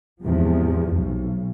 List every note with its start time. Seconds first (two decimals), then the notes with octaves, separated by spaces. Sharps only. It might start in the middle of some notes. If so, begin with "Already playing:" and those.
0.23 E2 G#2 C3 F3
0.97 B1